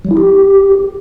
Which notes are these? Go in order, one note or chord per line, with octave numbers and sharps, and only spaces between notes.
F#3
E4
G4